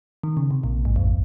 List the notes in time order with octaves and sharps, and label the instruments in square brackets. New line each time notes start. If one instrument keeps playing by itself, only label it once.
[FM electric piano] D#3
C#3
C3
A#1 A#2
G#1 G#2
F2